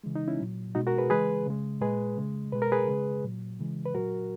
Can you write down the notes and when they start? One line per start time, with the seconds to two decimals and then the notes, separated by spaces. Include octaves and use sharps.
0.04 C#3 E3 G#3
0.15 D#4
0.28 C#4 E4
0.40 A#2 F#3
0.75 B2 G#3 D#4 F#4
0.87 F#4 A#4
0.98 G#4 B4
1.10 C#3 E3 G#3 G#4 B4
1.46 C#3 G#3
1.81 A#2 G#3 G#4 B4
2.17 C#3 G#3
2.52 B2 G#3 B4
2.62 A#4
2.72 G#4 B4
2.88 C#3 G#3
3.24 A#2 F#3
3.59 C#3 E3 G#3
3.85 B4
3.94 A#2 F#3 F#4 A#4